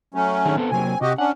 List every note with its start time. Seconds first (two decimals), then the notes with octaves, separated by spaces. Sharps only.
0.14 F#3 A3 C#4
0.45 D#3 D4 G#4
0.57 B3 C4 A4
0.71 C3 F#3 A#3 C4 G#5
1.01 C3 F#4 G4 D#5
1.18 C#4 D4 F#5